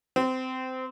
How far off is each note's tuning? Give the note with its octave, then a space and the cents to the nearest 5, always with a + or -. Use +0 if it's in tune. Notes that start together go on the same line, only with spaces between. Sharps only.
C4 -20